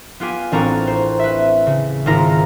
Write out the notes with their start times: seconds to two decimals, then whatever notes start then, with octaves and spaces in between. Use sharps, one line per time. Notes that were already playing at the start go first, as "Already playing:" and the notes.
0.20 B3 F4 G4 G#5
0.52 A1 C4 D4 A#4 A#5 C#6
0.87 C5
1.19 B4 E5
1.67 C#3
2.06 G#1 E4 F4 A#4 A#5 A#6